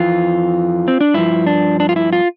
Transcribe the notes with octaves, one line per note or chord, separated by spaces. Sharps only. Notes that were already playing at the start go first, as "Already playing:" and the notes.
Already playing: F2 E3 F4
C4
D4
G2 F3 E4
D4
D4
F4
E4
F4